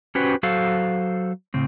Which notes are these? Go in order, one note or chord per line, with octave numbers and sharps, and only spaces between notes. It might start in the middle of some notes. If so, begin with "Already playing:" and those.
C#4 F#4 G4 B4 C5
F#3 F#4 A4 C5 F5
A2 C#3 C4